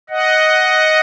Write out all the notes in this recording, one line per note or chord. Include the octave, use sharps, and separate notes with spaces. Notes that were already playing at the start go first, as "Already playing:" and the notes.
D#5 F#5